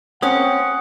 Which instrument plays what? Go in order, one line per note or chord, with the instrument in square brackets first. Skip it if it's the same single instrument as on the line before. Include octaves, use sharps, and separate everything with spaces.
[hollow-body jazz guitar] A#3 C4 C#4 [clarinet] F#5 [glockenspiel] D#6